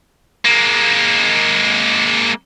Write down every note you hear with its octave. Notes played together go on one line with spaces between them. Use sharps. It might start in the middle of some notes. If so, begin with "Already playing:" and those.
G#3 A#3